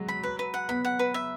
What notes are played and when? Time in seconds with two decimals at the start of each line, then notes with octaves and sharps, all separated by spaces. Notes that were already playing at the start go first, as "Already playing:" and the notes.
Already playing: F#3 G#3
0.08 B5
0.23 B4
0.39 B4
0.54 F#5
0.69 B3 B5
0.85 F#5
0.99 B4
1.14 E5